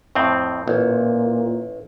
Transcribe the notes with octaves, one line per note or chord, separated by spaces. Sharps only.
F2 A2 C4
A1 A#2